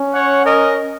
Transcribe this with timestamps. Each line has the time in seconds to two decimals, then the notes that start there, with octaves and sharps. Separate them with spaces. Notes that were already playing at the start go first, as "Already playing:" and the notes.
Already playing: C#4
0.13 C#5 F#5
0.45 A#4 D#5